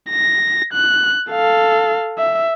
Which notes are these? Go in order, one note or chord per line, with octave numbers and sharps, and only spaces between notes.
A#6
F#6
A4 F5
E5